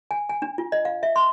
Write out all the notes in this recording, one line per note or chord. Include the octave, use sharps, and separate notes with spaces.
G#5
G#5
D4
F4
D#5
F5
E5
C6